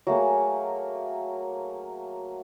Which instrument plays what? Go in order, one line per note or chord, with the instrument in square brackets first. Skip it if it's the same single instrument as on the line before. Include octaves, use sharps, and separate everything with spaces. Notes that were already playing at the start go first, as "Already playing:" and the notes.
[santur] F#3 A3 A#3 G#4